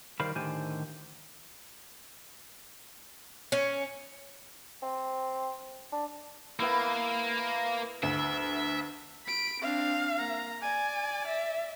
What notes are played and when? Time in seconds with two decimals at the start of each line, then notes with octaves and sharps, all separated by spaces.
0.20 D#3 G3 A#4 C5 F5 B5
0.35 A2 D3 D#3 G4 C5 G#5
3.52 C#4
4.82 C4
5.92 D4
6.60 A#3 B3 E4
8.03 D2 E5
9.26 B5 D7
9.62 C4 D4 F5
10.18 A#3 A#5
10.61 D5 G#5
11.27 E5